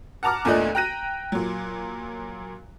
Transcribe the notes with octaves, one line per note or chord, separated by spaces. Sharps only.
F#5 A5 A#5 D6 F6
E2 A#2 A3 D4 D#5 F#6
G5 A#5 F#6 A#6 D#7
A#2 F#3